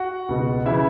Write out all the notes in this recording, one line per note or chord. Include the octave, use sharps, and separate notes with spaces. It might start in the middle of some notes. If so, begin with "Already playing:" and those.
Already playing: F#4 F#5
C#2 B2
C#3 E3 E4 E5